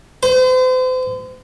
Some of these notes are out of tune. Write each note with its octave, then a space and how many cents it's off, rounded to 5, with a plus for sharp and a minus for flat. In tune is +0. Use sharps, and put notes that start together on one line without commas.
C5 -40